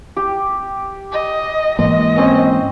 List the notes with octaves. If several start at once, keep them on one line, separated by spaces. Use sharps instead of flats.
G4
D#5
G#2 E3 A#3 D#5 C6
C4 C#4 C5